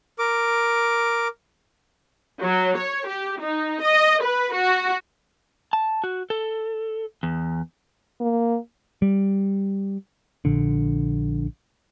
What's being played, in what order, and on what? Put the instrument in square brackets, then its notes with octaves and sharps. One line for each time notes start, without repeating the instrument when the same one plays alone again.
[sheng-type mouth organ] A#4 D6
[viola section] F#3
C#5
G4
D#4
D#5
B4
F#4
[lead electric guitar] A5
F#4
A4
E2
[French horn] A#3
[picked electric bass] G3
A#1 D3